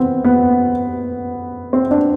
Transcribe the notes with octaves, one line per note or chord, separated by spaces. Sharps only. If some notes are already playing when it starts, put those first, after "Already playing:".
Already playing: C3 E3 B3 C4
B3
C4
D4